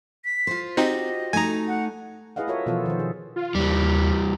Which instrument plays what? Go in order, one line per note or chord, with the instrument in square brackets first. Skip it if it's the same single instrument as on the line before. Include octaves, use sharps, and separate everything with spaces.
[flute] B6
[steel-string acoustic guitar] F4 C5
[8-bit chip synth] C4 D#4 [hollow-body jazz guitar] F#4 G4 [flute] D#5
[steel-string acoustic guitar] A3 D#4 [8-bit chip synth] G#5 A#5
[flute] F#5
[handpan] E4 G#4 B4 D#5 F5 F#5
F4 F#4 A4 A#4 C#5 E5
B2 E3 F3 B3 F4 A4
D#3 F3 C5
G#4
[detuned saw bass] F4
[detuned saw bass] D#2 [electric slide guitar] E3 G3